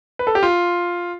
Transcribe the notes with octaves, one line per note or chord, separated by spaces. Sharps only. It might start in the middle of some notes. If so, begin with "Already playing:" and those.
B4
A4
G4
F4